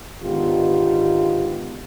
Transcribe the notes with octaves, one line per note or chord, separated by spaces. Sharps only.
G#2 D3 D#3 B3 F4 G4